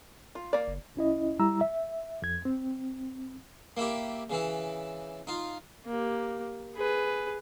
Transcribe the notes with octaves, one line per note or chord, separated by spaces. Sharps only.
F4
A#3 D5
F#1
C2 C#4 E4 D#5
G3 E4 A#5 E6
E5
F2 G#6
C4
A#3 E4 G4
C#3 E3 E4
D#4 F4
A#3 G4
G#4 B4